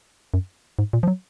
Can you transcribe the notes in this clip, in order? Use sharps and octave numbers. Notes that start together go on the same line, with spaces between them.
F#2
G#2
A#2
F3
F#3